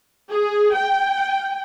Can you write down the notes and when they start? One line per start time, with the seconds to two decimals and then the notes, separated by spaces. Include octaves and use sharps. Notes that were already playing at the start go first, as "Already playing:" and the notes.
0.31 G#4
0.76 G5